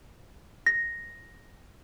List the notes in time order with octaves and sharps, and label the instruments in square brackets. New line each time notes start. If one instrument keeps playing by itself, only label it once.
[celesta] A#6